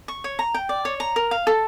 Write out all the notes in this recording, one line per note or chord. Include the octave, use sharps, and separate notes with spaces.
C#6
C#5
A#5
G5
D5
C#5
A#5
A#4
F5
A4